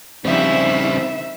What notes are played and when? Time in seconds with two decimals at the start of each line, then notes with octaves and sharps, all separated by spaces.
0.25 G2 C#3 F3 G3 B3 C4 D#4 E5